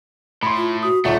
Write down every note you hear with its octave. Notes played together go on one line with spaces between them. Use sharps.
A2 B5 C6
F4
F#4 D#6
D#1 A3 F4 E5 F#5 C#6